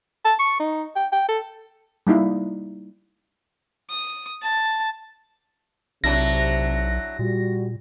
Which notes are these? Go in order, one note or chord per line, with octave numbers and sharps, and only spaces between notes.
A5
C#6
D#4
G5
G5
A4
G3 A#3 D#4 E4
D#6
A5
B1 C3 F#3 D4 E4 A#6
A#2 G3 F#4